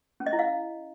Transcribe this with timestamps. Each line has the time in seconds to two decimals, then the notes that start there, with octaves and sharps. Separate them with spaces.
0.20 C#4
0.26 D#5
0.33 E4
0.39 F5